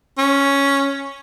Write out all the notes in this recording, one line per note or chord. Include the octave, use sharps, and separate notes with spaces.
C#4